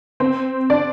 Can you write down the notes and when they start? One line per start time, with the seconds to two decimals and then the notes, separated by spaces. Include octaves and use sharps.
0.20 C4 C5
0.70 D4 D5